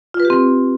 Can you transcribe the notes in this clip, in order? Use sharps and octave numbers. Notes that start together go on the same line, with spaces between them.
F4
B4
G4
C4